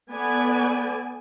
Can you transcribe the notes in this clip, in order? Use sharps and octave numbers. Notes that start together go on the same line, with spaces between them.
B3 A4 D5 G#5